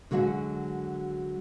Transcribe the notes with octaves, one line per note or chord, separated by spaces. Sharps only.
D3 F#3 G#3 F#4